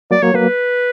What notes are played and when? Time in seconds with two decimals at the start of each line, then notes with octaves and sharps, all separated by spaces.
0.11 F#3 A#3 D5
0.23 F#3 A#3 C#5
0.34 F#3 A#3 B4